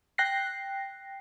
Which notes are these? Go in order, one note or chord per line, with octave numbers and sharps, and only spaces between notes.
G5 F#6 A#6 C7